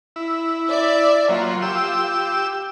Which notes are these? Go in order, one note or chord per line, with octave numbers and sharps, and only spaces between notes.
E4
D5 E5
F#3 A#3 F4
G4 E6